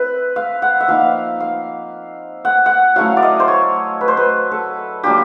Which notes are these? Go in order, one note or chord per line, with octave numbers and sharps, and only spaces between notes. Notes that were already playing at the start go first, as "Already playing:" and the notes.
Already playing: C4 E4 B4
F5
F#5
E5
F3 A#3 D#4 F5
F5
F#5
F#5
F#3 A3 C#4 E4 F5
D5
D#5
C5
C#5
B4
C5
B4
A4
F#3 A#3 D4 F4 G4